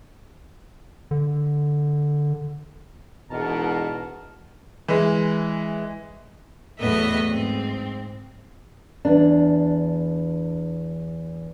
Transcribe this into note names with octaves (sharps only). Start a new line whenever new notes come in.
D3
E1 E2 G#2 B2 A5 A#5 F6
E3 G#3
E2 A2 F#3 B3 D#5 E5
G#2 C4
E2 D4